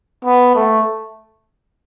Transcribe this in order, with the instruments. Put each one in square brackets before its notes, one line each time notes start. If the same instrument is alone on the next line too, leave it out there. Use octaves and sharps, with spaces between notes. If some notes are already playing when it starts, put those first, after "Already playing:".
[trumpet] B3
A3